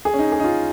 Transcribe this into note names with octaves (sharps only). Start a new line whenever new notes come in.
G#4
C#4
D#4
G#4
D#4
F4